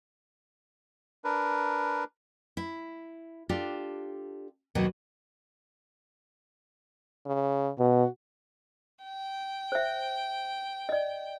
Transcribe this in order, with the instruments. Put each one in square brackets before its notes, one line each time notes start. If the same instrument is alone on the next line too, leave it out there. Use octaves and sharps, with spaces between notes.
[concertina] D4 A#4 B4
[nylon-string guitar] E4
D4 F4 G4 A4
D#2 B2 D#3 F#3
[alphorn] C#3
[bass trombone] B2 [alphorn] F#4
[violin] G5
[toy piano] C5 E5
D5 D#5